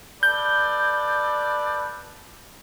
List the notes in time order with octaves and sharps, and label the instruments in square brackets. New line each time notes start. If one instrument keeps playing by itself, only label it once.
[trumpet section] A4 B4 D5 [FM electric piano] G6